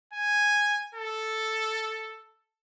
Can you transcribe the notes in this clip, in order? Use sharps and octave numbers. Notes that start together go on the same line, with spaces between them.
G#5
A4